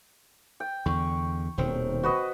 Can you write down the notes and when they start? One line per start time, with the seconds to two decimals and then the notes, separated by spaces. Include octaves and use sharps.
0.60 G5
0.86 E2 D3 C#6
1.58 D#1 B2 D#3 C4
2.03 F#4 B4 D#5